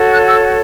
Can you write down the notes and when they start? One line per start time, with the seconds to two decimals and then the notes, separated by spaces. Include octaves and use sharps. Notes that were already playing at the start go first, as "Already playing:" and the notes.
Already playing: F#4 A4 C#5
0.12 F#6
0.25 E6